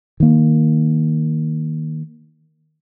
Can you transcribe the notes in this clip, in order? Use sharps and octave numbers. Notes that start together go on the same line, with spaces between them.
D#3 A#3